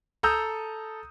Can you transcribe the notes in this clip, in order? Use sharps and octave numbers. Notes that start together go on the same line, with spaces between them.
A4 A#5 D#6 E6 G6